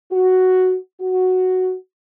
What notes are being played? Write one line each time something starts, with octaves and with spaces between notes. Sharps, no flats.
F#4
F#4